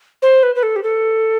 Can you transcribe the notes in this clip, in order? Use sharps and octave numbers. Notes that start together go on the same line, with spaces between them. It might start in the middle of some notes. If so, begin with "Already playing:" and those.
C5
B4
B4
A4
G4
A4